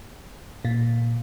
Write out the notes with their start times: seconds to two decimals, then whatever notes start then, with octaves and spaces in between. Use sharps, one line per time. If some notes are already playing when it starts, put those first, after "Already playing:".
0.65 A#2